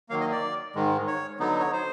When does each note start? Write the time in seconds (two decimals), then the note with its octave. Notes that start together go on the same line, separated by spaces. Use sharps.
0.09 D#3 F#3 A#3 F5
0.21 D#5
0.32 D5
0.75 G#2 D#3 G#3
1.07 C#5
1.39 D3 F#3 B3 D#4
1.60 C#5
1.72 C5